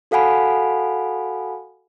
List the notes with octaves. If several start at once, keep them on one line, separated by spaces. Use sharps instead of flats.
F#4 A4 F5 F#5 G#5 B5